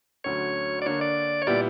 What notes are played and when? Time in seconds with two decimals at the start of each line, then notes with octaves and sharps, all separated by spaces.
0.24 D2 D3 F#3 C#4 C#5
0.82 D5
0.86 D3 A#3 D4 C#5
1.01 D5
1.42 C#5
1.47 A#2 G3 B3 E4 G4 D5